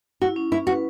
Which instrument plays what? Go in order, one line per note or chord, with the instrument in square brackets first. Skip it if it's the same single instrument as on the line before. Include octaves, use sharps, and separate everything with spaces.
[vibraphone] E4 [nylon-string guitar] F#4
[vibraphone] C#4
[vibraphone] C#4 [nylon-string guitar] E4
[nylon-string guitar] F#4 [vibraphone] B4